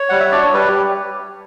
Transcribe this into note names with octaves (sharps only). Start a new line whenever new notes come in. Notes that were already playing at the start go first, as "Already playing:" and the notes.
Already playing: C#5
G3 F#5
E5
D4 F#4 D5
C#5
G3 B4
G4